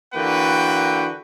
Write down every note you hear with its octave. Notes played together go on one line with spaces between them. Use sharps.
D3 E3 A#3 F#4 B4 G5